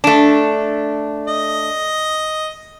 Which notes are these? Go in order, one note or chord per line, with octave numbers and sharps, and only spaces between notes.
A3 D4
D#5